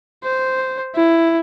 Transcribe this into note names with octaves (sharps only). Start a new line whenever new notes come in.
C5
E4